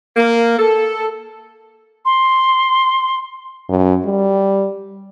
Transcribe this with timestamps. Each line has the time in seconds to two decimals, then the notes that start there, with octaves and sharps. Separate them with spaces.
0.16 A#3
0.59 A4
2.05 C6
3.69 F#2
4.05 G3